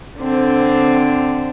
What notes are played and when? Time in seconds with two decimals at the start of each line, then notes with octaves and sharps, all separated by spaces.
0.20 D3 C4